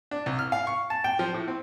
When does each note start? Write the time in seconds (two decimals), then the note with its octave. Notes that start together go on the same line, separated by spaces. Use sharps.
0.11 D4
0.26 C2
0.39 F6
0.52 F5
0.67 C#6
0.90 A5
1.04 G5
1.19 F3
1.34 A2
1.48 C4